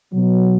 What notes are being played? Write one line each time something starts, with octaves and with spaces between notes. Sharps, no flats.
B2 F#3